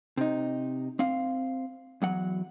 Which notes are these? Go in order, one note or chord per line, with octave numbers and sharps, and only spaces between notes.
C3 D#4
C4 F5
E2 F#3 F#5